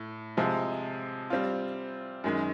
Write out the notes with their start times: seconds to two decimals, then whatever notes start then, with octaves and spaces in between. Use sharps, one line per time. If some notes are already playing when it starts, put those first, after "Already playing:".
Already playing: A2
0.37 C3 F3 G#3
1.30 G3 C4 F4
2.24 F#2 D#3 G#3